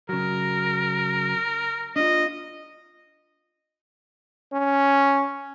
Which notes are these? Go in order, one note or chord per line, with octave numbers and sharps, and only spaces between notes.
C#3 F#3 A#4
D4 F4 D#5
C#4